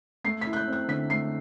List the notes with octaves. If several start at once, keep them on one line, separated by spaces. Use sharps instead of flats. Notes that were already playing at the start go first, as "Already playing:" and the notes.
A3 C7
B6
E4
F#6
G6
C4 F#6
D3 B6
A3 C7